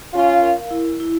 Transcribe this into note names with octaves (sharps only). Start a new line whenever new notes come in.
C#4 F4 F5
A#4
E4
E4